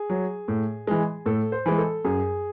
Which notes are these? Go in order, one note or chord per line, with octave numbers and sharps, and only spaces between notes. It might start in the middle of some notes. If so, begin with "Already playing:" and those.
Already playing: G#4
F#3
A2
E3 G#3
A2 A4
C5
E3 G#3
A4
F#2 G#4